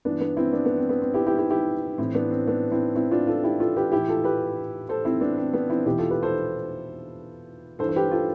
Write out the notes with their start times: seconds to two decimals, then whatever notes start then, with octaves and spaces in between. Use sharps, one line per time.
0.05 G2 E3 B3 D4
0.20 B3 D4
0.37 C4 E4
0.53 B3 D4
0.65 B3
0.78 C4
0.89 B3
1.02 C4
1.14 E4 G4
1.26 E4 G4
1.38 E4 G4
1.50 E4 G4
1.98 A2 E3 C4 E4
2.14 B3 D4
2.31 C4
2.47 B3 D4
2.71 C4 E4
2.95 C4 E4
3.11 D4 F4
3.27 F4 A4
3.44 E4 G4
3.60 F4 A4
3.76 G4 B4
3.92 A2 E3 E4 G4
4.09 F4 A4
4.24 G4 B4
4.89 A4 C5
5.05 C4 E4
5.21 B3 D4
5.38 C4
5.54 B3 D4
5.70 C4 E4
5.85 E2 B2 E4 G4
5.98 F4 A4
6.10 G4 B4
6.23 A4 C5
7.79 G2 E3 A4 C5
7.89 C5
7.96 G4 B4
8.11 F4 A4